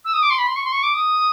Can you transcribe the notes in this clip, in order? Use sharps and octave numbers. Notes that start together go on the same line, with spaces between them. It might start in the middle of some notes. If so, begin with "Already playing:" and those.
E6
D#6
D6
C6
B5
C6
C#6
C6
C#6
D6
D#6